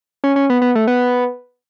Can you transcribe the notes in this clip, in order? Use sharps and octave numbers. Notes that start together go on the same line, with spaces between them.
C#4
C#4
B3
B3
A3
B3